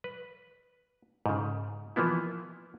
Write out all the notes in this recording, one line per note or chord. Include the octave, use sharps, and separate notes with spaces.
B4
G#2 C#3
E3 F3 A#3 B3 E4